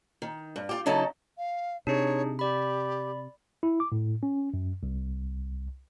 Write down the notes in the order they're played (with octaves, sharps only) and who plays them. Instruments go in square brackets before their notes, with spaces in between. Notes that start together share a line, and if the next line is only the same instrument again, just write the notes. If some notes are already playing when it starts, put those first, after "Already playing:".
[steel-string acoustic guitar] D#3
G2
F4 G4
C#3 F#3 D#4 E4 A4 A5
[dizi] F5
[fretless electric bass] C3 [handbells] D4 D#4 G#4 [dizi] C#5
[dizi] G4 [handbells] D5 B5
[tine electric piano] E4
D6
A2
C#4
F#2
C2